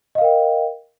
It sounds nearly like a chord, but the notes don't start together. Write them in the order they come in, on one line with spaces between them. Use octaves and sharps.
D#5 F5 A#4 G5